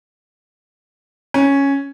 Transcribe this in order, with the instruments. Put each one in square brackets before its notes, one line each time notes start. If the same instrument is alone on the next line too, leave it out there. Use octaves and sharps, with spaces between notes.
[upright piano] C#4